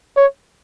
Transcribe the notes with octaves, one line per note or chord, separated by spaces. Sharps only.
C#5